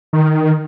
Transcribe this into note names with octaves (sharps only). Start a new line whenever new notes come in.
D#3